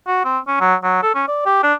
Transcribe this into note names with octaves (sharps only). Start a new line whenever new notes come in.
F#4
C4
C#4
F#3
F#3
A4
C#4
D5
G4
D4